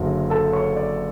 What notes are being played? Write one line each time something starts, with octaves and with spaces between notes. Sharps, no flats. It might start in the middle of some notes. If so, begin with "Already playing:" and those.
Already playing: F#1 F#2 D3 F#4
A4 A5
C#5 C#6
D5